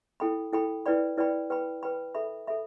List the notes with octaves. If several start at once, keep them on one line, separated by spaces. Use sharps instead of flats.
E4 A4 G5 B5
E4 A4 G5 B5
E4 B4 D5 G5 B5
E4 B4 D5 G5 B5
B4 G5 B5
B4 G5 B5
A4 E5 B5
A4 E5 B5